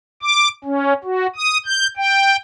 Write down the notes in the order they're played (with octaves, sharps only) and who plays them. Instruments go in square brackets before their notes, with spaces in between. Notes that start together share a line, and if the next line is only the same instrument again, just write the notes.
[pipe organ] D6
C#4
F#4
D#6
G6
G5